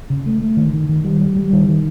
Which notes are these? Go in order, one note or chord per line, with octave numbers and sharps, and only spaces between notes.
C#3
A3
A3
D#3
D#3
D#3
G3
G3
G3
D#3
D#3